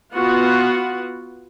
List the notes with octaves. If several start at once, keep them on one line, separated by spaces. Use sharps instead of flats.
B3 F4 F#4 F#5